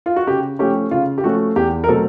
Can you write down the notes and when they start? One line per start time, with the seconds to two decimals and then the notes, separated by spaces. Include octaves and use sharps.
0.06 F4
0.16 F#4
0.27 C#3 G4
0.59 F3 A3 C#4 G4
0.91 C#3 F4
1.18 G4
1.24 F3 A3 C#4 F#4
1.56 E2 G4
1.84 A#4
1.88 B2 F#3 A3 C4 A4